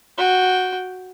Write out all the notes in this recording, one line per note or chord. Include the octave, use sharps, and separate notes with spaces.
F#4 G5